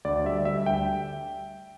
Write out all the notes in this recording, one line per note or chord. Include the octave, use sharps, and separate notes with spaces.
D2 D5
G3 E5
G3 E5
D2 G5